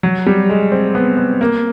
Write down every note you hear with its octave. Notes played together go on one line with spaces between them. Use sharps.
F#3
G3
G#3
C4
B3
B3
A#3